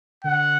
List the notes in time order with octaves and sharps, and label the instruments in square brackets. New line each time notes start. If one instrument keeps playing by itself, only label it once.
[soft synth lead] D3 [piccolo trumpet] F#5